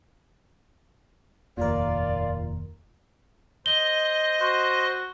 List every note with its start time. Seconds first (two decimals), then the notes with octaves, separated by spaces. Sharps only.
1.57 F1 D#2 A#2 F4 A#4 D5
3.66 C5 D#5 G7
4.40 F#4 C5